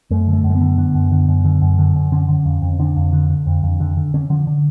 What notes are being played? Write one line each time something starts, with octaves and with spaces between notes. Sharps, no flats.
F#2 A3
D3
A3
F#2
A3
B3
D3
D3
F#2
D3
F#2
D3
F#2
D3
F#2
D3 C#4
D3
F2
F2
D3 D4
F2
D3
D3
F2
F2
D3
D3
D3 C#4
D3 F3
D3